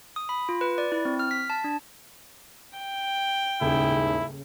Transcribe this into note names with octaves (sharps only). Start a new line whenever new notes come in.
D#6
B5
F4
B4
D5
E4
C4
F6
B6
A5
D4
G5
D#1 G#2 C#3 E4 G#4